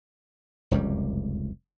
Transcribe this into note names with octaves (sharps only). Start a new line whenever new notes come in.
F1 C#2 F#2 G3